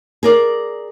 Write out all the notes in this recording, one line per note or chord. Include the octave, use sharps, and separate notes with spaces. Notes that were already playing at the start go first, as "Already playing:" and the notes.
G#4 A#4 D5